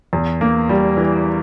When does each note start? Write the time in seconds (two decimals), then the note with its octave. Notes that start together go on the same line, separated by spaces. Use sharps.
0.13 E2
0.41 A#3
0.69 G3
0.97 E3